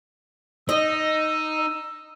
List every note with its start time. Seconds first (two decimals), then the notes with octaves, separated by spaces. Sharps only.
0.69 D#4 D#5 E6